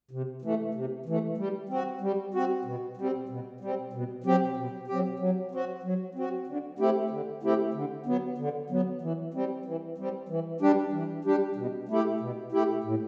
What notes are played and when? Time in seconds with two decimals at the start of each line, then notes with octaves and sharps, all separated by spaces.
0.11 C3
0.42 E3 A3
0.74 C3
1.06 E3 A3
1.37 G3
1.69 C4 F#4
2.01 G3
2.34 C4 F#4
2.65 B2
2.97 G3 C4
3.29 B2
3.60 G3 C4
3.93 B2
4.24 F#3 C4 G4
4.57 B2
4.87 F#3 C4 G4
5.19 F#3
5.51 C4 F#4
5.83 F#3
6.15 C4 F#4
6.47 D3
6.79 A3 C4 E4 G4
7.10 D3
7.43 A3 C4 E4 G4
7.74 D3
8.06 F#3 B3
8.38 D3
8.70 F#3 B3
9.02 E3
9.34 G3 C4
9.65 E3
9.98 G3 C4
10.29 E3
10.61 G3 D4 G4
10.93 E3
11.24 G3 D4 G4
11.56 B2
11.89 A3 E4 G4
12.21 B2
12.52 A3 E4 G4
12.84 A2